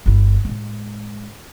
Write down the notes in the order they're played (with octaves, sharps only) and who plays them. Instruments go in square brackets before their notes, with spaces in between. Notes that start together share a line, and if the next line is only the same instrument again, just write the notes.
[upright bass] G1 E4
A2 G#3